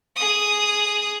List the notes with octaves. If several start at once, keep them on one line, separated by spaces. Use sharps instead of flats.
G#4 D#6